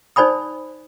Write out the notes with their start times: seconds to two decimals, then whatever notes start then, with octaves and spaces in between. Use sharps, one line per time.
0.16 D#4 C5 D5 G#5 B5 D#6